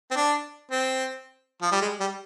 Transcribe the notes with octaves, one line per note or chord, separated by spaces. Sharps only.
C4
D4
C4
F3
G3
G#3
G3